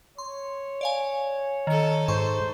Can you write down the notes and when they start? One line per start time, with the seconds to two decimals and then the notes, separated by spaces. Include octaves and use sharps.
0.18 C#5 C6
0.81 D5 F5 G#5
1.67 D#3 D#4 A4 C#7
2.08 G#2 C5 C6 C#6